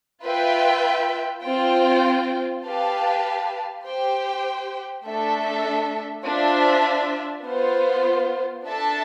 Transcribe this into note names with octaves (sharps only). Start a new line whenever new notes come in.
F4 B4 E5 G5
C4 F4 C5 G5
G4 B4 F5 A5
G4 C5 G5
A3 D4 A4 E5
D4 F4 C5 E5
B3 F4 C5
D4 A4 E5 A5